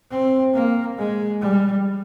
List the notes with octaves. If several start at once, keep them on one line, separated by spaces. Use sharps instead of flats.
C4
A#3
G#3
G3